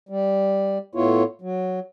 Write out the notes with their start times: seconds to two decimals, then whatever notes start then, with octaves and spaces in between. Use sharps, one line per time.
0.09 G3
0.95 A2 B3 E4 F4 C#5
1.41 F#3